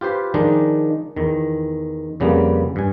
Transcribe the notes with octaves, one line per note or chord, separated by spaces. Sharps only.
F4 G4 B4 C5
D#3 F3 G#3 D4 D#4
E2 D#3
F2 C#3 G3 A#3 B3
G2 G#5